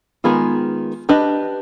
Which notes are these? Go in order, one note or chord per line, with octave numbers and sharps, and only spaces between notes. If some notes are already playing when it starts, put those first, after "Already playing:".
D#3 G#3 B3 F4 G#4
D4 G4 B4 D#5